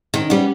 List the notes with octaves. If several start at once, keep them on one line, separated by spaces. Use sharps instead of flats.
D#3 C#4
G3 B3